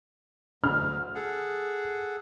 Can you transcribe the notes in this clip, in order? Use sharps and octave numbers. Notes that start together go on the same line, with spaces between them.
D2 D3 F6
G#4 A4 F#5